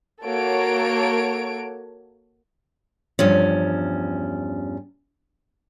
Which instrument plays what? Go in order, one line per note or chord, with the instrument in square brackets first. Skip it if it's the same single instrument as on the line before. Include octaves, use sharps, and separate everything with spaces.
[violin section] A#3 F#4 A4 C#5 D7
[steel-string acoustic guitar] E2 G2 F3 C#4